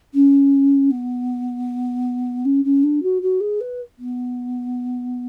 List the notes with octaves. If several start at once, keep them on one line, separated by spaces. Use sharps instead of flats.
C#4
B3
C#4
C#4
D4
F#4
F#4
G#4
B4
B3